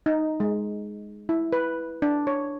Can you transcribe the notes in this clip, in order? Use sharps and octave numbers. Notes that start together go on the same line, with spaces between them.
D#4
G#3
E4
B4
D4
C#5